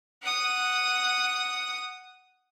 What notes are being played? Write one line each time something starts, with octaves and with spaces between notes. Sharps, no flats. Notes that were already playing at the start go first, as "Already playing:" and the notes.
F#5 D#6